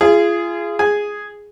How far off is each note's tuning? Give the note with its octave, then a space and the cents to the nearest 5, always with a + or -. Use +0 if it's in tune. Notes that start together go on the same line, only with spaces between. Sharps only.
F4 -35 G#4 +0
G#4 +0 G#5 +0